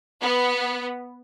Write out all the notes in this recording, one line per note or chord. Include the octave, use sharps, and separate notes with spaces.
B3